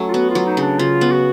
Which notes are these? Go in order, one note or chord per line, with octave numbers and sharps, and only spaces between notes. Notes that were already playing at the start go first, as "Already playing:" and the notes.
Already playing: F#3 A3 C#4
F4
B3 F#4
F4
F#3
D#4
C#3
D4
C#3 F4
B3
F#4